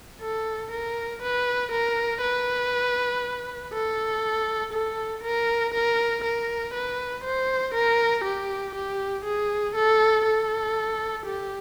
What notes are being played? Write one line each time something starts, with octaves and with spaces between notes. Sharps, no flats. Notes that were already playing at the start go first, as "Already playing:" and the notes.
A4
A#4
B4
A#4
B4
A4
A4
A#4
A#4
A#4
B4
C5
A#4
G4
G4
G#4
A4
A4
G4